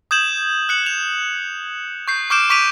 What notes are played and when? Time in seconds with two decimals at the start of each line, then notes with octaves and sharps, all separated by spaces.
0.11 D#6 G6 G#6 E7 F#7
0.69 F#6 C#7 F#7
0.86 F7
2.08 C#6 G6 C7
2.30 C#6 D6 F6 G6 D7 E7
2.50 C#6 D6 B6 D7 D#7 F7